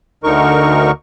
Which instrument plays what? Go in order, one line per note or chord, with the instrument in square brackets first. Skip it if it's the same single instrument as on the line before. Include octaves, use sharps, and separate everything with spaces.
[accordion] D2 D3 D#4 A#4 C#6